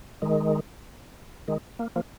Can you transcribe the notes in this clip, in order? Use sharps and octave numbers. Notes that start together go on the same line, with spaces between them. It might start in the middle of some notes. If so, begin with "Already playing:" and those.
D#3 G#3
D#3 G#3
A#3
F3 A#3